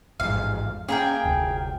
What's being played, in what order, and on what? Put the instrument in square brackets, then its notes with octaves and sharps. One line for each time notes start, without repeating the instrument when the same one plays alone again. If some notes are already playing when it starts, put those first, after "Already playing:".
[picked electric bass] A1 F2 G#2 [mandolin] F5
[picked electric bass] A#3 C#4 [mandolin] G#4 A#4 G5
[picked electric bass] F1 D2